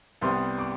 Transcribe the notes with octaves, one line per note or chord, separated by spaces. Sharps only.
C2 C3 G3 B3 C6
D6